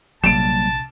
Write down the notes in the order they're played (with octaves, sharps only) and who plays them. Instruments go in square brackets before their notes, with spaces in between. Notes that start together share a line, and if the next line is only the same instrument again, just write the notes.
[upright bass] A#1 C3 [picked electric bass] F#3 G3 A#3 [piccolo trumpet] A5 [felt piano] D7 E7